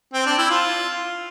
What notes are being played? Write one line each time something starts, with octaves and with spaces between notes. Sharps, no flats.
C4
D4
E4
F4